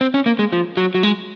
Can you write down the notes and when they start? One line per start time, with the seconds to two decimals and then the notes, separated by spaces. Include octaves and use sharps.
0.01 C4
0.14 C#4
0.26 A#3
0.39 G#3
0.53 F3
0.77 F#3
0.95 F#3
1.03 G#3